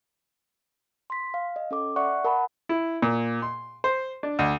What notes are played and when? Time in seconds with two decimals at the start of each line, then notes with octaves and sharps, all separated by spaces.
1.10 C6 B6
1.34 F5
1.56 D#5
1.71 C#4 A4 D6
1.96 D5 E5 F#5 C#6 F#6
2.24 A#4 F#5 A5 B5
2.69 E4
3.02 A#2
3.42 C6
3.84 C5
4.23 D4
4.39 D2